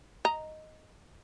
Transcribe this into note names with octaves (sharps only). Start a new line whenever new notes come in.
D#5 A#5